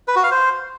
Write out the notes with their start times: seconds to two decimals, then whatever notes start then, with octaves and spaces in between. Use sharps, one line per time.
0.08 B4
0.16 F#4
0.23 F5
0.31 C5